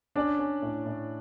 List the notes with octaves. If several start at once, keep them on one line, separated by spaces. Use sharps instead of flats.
C#4 D4 D5
C#4
A2
A2